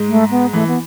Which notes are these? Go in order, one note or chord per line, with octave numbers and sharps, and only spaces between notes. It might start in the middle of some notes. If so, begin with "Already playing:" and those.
Already playing: G#2 G#3
A3
B3
E3 A3
B3